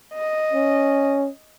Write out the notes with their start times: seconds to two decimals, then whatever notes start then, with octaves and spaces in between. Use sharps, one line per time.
0.14 D#5
0.54 C#4